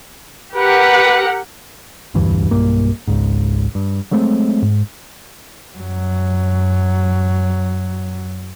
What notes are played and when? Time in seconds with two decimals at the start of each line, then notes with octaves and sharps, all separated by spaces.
0.55 G4 A#4 B4 F#5
2.14 E1 D2 G2 E3
2.51 B1 G2 A#3
3.08 G#1 C#2 G#2
3.75 G2
4.11 F#3 G#3 A3 C4
4.62 G#2
5.76 F#2 F#3